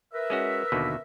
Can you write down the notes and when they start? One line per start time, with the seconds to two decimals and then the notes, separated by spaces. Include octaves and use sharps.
0.13 A#4 B4 E5
0.30 G#3 C#4 F#4
0.72 D#2 B2 D3